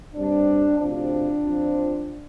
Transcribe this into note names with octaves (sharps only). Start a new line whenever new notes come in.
G2 G3 C4 D4
D2 C3 F3 C4 D4
F2 F3 C4